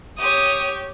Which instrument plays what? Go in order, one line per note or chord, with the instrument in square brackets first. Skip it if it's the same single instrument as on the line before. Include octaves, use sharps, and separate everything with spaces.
[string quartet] G4 C#5 [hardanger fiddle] D#6